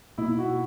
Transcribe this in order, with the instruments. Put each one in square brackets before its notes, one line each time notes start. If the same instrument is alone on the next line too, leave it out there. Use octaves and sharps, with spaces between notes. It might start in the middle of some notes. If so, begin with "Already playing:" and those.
[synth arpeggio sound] B2 A#3 D#4 [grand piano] E4
[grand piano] F#4